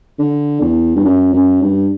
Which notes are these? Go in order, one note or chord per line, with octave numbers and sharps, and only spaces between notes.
D3
E2
G2
F#2
F#2
G2